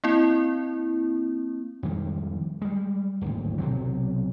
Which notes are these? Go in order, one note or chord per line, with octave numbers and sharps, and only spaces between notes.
A#3 C4 E4
F2 D#3 G3 G#3
G3 G#3
D1 G#1 D#2
B1 C3 F#3